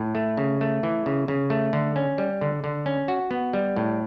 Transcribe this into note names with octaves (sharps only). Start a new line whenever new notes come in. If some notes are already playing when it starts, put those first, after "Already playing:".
Already playing: A2
A3
C#3
A3
E3
C#3
C#3
A3
D3
C#4
G3
D3
D3
C#4
F#4
B3
G3
A2